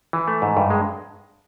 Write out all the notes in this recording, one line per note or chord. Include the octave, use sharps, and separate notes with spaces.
E3
A3
G#2
G2
G#3